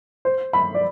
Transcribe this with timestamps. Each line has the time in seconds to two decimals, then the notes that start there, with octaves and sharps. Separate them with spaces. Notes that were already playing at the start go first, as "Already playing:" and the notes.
0.25 C5
0.53 B5
0.75 D5